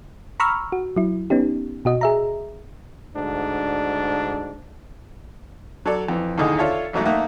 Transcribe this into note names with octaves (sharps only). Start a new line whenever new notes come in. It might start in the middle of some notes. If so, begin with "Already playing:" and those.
A#5 B5 C#6 E6 F6
F#4
F#3 E4
B3 C#4 D#4 G4
B2 F#4 D#5
G#4 E5 A#5
D2 G#2 D4
F#3 A4 D5
F2 E3
D#2 A2 D3 D#4 G#4 D#5
D4 F4 A4 C#5 E5
A1 G#2 F#3 A3 A#5
A3 A#3 D#4 E5 F#5